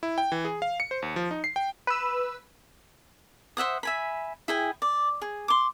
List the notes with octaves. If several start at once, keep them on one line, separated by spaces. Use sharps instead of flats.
E4
G5
E3
G#4
F5
C#7
C5
D#2
F3
D#4
C7
G5
B4 E6
C5 E5 F#5 D#6
E5 G#5 B5
E4 G#4 G5 G#5
D5
G#4
C6 D6